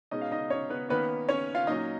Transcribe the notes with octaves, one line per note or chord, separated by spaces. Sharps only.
B2 G#3 C#4 D#4 D#5
F5
D#4 D#5
C#4 C#5
B3 B4
D#3 A#3 B3 C#4 B4
C#4 C#5
F4 F5
A#2 F#3 C#4 D#4 D#5